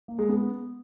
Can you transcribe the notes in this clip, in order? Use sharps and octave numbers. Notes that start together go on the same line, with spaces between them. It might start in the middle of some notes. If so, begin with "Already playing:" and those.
A#3
G#3
B3